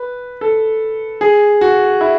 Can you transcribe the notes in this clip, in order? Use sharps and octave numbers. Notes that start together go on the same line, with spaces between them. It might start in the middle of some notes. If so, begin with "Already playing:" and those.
Already playing: B4
A4
G#4
F#4
E4